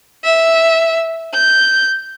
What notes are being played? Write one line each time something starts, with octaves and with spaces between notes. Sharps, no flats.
E5
G6